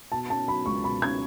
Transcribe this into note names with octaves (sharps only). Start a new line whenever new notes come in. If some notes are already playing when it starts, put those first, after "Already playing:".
B2 A5
C#4 A5
F#3 B5
C#2 C#6
B2 B5
C#4 G#6